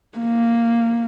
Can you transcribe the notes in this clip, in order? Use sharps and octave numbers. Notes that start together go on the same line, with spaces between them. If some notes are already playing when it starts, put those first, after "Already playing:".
A#3